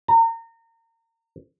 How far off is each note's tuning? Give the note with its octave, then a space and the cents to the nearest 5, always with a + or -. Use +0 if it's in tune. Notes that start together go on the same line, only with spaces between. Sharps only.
A#5 -30